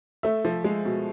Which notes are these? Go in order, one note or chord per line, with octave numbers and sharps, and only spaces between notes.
A3 E5
F3
G#3
B2